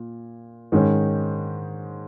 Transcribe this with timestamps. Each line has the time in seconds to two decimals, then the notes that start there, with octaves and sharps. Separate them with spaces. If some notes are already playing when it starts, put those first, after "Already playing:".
Already playing: A#2
0.72 G#2 D#3 G#3 C#4